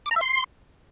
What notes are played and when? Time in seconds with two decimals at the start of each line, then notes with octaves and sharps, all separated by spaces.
0.06 D6
0.11 A#5
0.16 E5
0.21 C6